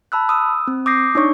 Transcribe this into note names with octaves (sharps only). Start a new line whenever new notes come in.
A5 B5 E6 F#6
D#6 E6
C4
D6 D#6 G6 A#6 C7
D4 D#4 C#5 C#6